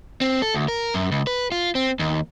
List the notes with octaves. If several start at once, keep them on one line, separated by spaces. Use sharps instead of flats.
C4
A4
D2
A#4
F#2
C#2
B4
F4
C4
D#2